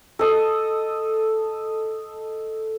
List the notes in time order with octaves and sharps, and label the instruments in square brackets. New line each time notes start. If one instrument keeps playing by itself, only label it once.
[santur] A4 D#5